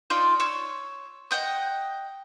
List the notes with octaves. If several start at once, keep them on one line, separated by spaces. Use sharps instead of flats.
D#4 F4 D5
C#5 E6
D#5 F#5 G5 D#6